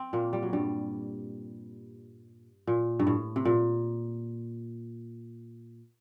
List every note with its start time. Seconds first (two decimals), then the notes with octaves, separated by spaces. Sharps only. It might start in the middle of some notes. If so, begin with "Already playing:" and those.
Already playing: C4
0.13 A#2 A#3
0.33 G3
0.42 F#3
0.53 G2 G3
2.67 A#2
2.99 G2
3.07 A2
3.36 C3
3.45 A#2